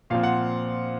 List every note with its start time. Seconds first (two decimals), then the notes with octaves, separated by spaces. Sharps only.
0.10 A#2 F3 C4 F5
0.23 F#5